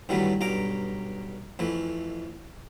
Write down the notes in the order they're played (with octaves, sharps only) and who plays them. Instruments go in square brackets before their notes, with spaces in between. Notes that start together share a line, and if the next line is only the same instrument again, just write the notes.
[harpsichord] G2 D#3 E3 F#3 G3 A3
B1 G2 A#5 D6
F2 E3 A3